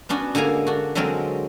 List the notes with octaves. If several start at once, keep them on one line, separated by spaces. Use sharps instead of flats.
B3 C#4 D4 F#4
D3 G#3 A#3 G#5 A#5
D4 F#4
D3 F#3 G#3 C4 A#4